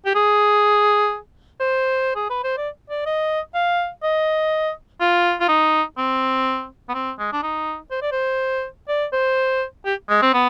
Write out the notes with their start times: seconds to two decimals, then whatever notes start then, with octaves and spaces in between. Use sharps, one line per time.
0.06 G4
0.15 G#4
1.60 C5
2.16 G#4
2.30 B4
2.44 C5
2.58 D5
2.90 D5
3.06 D#5
3.55 F5
4.03 D#5
5.01 F4
5.41 F4
5.49 D#4
5.98 C4
6.89 B3
6.94 C4
7.19 G#3
7.33 D4
7.43 D#4
7.91 C5
8.02 D5
8.12 C5
8.89 D5
9.13 C5
9.86 G4
10.09 G#3
10.22 C4
10.34 B3